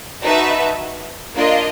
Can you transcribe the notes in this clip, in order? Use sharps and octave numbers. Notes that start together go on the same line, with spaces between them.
D#4 F#4 B4 E5 A5
A#3 D4 F4 A#4 D#5